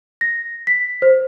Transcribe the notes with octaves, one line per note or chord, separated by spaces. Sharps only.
A#6
B6
C5